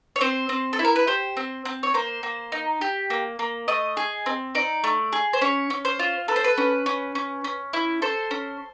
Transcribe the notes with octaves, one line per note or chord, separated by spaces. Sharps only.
C#5
C4 C5
C4
A4
E4
A#4
B4
G4 C5
C4
C4
C#5
A#3 C5
A#3
D#4
G4
A#3
A#3
A3 D#5
G#4
C4
D#4 D5
A3
G#4
C5
C#4 C#5
C#4
C5
F4
A4 B4
C5
B4
C#4
C#4
C#4
C#4
E4
A4 C5
C#4